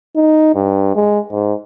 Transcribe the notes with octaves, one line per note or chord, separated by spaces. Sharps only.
D#4
G2
G#3
G#2